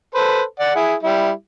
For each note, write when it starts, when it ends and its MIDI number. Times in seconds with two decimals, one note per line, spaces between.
0.15 0.42 69
0.15 0.42 71
0.15 0.42 72
0.60 0.76 74
0.60 0.76 78
0.76 0.94 64
0.76 0.94 68
1.03 1.30 55
1.03 1.30 64